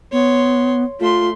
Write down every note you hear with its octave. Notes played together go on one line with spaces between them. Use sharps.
B3 C#5 C6
A3 F4 C6